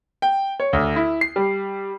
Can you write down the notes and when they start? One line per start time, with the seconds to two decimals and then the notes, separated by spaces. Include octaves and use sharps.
0.22 G5
0.60 C#5
0.73 D2
0.96 E4
1.21 C7
1.36 G3